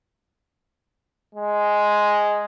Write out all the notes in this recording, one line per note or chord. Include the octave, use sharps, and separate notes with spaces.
G#3